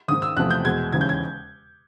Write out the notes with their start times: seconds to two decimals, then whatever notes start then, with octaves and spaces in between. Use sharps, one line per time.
0.08 G#1 G#2 D#3 D#6
0.22 E6
0.37 E2 C3 F3 A3 F#6
0.50 G6
0.65 E2 B2 G#3 G#6
0.92 E1 D#2 C#3 E3 G#6
1.01 G6
1.09 G#6